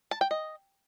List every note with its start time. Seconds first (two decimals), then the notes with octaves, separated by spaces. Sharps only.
0.11 A5
0.21 G5
0.31 D#5